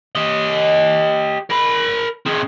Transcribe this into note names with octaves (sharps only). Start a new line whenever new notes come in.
G4 D#5
A#4 B5
C4 G#4